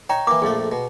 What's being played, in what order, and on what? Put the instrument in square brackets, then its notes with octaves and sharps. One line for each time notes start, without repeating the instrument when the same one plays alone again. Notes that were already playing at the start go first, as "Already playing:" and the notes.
[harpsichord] D#4 C#5 [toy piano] G5 A#5
[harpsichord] E3 A#3 [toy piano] D6
[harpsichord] A#1 F2 A3 [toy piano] G#4
[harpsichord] B2